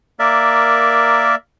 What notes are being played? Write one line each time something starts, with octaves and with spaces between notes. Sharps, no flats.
A#3 A#4 D5 E5